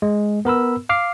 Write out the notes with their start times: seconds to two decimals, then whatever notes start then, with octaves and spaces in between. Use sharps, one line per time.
0.02 G#3
0.45 B3 A#4 B5 E6
0.89 F5 D6 F6 C7